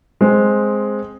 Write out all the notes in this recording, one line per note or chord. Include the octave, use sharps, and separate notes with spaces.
G#3 C4